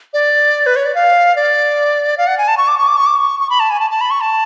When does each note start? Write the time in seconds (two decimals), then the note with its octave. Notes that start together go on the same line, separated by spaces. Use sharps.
0.14 D5
0.66 B4
0.76 C#5
0.85 D5
0.95 F5
1.36 D5
2.18 F5
2.27 F#5
2.38 G#5
2.48 A5
2.58 C#6
2.68 D6
2.78 C#6
2.87 D6
2.97 C#6
3.06 D6
3.16 C#6
3.40 C#6
3.50 B5
3.60 A5
3.71 G#5
3.80 A5
3.91 A5
4.01 B5
4.11 C#6
4.21 A5